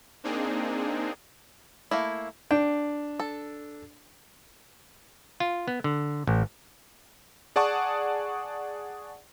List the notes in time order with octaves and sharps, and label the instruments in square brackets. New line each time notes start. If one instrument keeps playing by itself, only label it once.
[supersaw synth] A#3 C4 D4 D#4 G#4
[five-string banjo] A3 A#3 E4
[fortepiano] D4 [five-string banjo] G5
[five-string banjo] A4
[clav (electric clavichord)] F4
B3
D3
A1
[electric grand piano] G#4 D5 F#5 A5 C#6 D#6